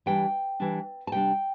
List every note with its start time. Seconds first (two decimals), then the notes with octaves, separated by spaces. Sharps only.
0.06 E3 G3 D4 G5
0.60 E3 G3 D4
1.07 A5
1.12 C3 G3 D4 G5